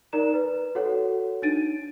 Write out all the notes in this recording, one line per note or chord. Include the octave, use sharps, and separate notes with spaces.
D#4 A#4 D5 A#5 E7
B4
F#4 A4 C#5 F#5
D4 D#4 A6 D7 D#7